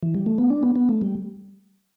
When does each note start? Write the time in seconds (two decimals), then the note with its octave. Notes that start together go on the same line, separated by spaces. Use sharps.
0.03 E3
0.14 G3
0.26 A3
0.38 B3
0.50 D4
0.63 B3
0.76 B3
0.89 A3
1.01 G3